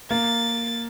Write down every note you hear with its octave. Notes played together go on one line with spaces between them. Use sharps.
A#3 A6